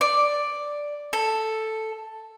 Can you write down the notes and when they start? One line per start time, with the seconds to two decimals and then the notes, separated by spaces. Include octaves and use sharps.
0.01 D5
1.13 A4